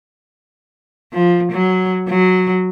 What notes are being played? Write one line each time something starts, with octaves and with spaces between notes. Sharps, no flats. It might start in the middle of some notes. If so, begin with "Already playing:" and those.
F3
F#3
F#3